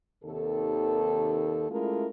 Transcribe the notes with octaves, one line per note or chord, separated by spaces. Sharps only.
D#2 C3 D#3 A4
G#3 A3 C#4 E4 F4 A#4